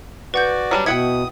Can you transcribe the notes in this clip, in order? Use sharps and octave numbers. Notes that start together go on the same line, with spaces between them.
F#4 B4 D5 F#5 G6
F#3 G3 D4
B2 E4 F#5 G5 D#6 G#6 C#7